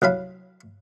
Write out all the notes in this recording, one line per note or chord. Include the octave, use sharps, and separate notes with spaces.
C2 F#3 F5 B5